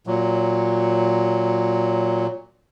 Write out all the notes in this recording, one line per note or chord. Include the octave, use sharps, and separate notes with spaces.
A#2 F#3